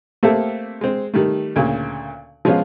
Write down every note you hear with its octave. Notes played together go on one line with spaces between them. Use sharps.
A3 A#3 C4 G4 A4 E5
G#3 C4
D#3 G3 A3
D2 A#2 C#3
F3 G#3 B3 C#4 F4